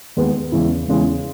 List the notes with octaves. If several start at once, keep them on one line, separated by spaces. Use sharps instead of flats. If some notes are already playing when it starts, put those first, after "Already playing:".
D#2 D#3 G#3 B3 D#4
E2 C#3 G#3 C#4 E4
E2 C#3 G#3 C#4 E4